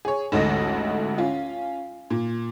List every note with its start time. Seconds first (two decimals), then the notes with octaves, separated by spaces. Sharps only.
0.05 G#4 C#5
0.32 A1 D2 G#2 A4 D#5 A#6
1.18 C#4 F4
2.10 A#2